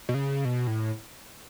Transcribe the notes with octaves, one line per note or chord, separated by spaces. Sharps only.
B2
C#3
B2
A2